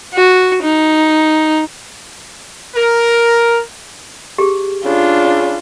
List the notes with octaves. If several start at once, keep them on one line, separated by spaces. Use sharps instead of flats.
F#4
D#4
A#4
G4 G#4
C#3 D4 F4